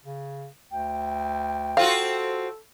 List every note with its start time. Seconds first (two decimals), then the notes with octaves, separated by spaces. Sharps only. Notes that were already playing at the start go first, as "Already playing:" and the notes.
0.05 C#3
0.72 D2 G5
1.77 C4 F4 F#4 A4 F5